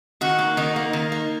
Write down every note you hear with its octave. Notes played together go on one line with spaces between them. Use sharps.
D#3 F#4
A#3
D#3 D#4
A#3
D#3
A#3